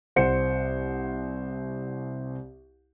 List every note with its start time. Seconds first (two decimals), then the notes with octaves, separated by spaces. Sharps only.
0.16 C2 C5 F#5 C#7